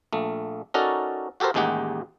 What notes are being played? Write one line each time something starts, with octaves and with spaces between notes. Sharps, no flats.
A#1 A3
C#4 D#4 F#4 A4 A#4 D5
F#4 G4 A4 A#4 C5
A1 D#2 G#3 D#4 G4 F#5